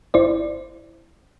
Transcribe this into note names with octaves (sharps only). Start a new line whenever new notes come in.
G1 E4 C5 D5